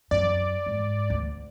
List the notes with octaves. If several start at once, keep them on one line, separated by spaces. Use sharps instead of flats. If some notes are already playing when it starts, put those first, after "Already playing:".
F#2 D5
G#2
D2